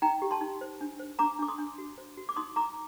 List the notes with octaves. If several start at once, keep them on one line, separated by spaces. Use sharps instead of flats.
D#4 G5 A#5
G4
A5 C6
D#4
C5
D4
C5
D4 A#5 D6
D4 D6
C6 D#6
D4
F#4
C5
F#4
D6
D#4 C6 D#6
D#4 A#5 D6